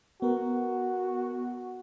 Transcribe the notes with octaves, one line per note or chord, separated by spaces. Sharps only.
B3 F#4 A#4